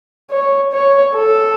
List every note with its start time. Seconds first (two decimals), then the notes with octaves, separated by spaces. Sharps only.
0.31 C#5
0.72 C#5
1.16 A4